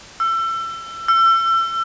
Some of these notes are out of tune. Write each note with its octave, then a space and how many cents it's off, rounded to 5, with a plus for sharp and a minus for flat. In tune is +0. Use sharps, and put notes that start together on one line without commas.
E6 +30
E6 +35